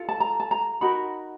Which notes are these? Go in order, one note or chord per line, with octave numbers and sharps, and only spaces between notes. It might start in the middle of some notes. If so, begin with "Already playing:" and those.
Already playing: F4 A4
A5
A#5
A5
A#5
D#4 F#4 A#4 B5